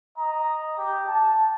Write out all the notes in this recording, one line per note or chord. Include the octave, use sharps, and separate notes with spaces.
D#5 A#5
G4
A5